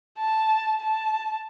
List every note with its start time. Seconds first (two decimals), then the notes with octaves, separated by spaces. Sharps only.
0.19 A5
0.80 A5